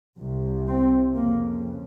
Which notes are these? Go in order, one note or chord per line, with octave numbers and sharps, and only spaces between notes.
C2 C3
C4
F2 C#3 A#3